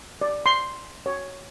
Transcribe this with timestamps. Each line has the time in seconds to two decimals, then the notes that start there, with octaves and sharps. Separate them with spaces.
0.21 D5
0.46 C6
1.06 C#5